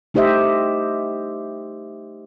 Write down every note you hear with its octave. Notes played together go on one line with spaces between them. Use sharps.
A3 D#4 G4 C5 D#5 E5